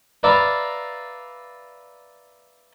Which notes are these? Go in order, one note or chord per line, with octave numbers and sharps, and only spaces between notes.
B4 D5 E5 F5 A#5 B5